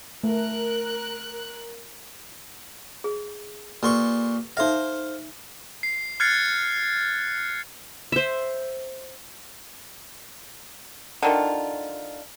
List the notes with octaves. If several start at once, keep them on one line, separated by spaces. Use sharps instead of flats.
A3 A#4 F#6
G#4
A#2 G4 A4 B4 C6 C#6
D#4 A4 C5 E5 F5
C7
F6 F#6 G#6 A6 C7 C#7
C5 E5
D3 D#3 F4